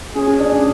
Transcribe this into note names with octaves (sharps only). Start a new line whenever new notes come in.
C#4 G#4
C#4
D4
C#4